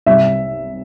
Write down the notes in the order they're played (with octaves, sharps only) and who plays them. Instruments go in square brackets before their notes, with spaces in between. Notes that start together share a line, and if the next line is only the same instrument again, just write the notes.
[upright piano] C2 E5